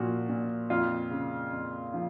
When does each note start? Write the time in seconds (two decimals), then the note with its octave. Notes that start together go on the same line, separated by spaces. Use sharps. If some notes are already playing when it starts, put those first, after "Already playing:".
Already playing: A#2 F3 F#4
0.29 A#2
0.70 F2 F4
1.11 C#3
1.52 F2
1.94 F3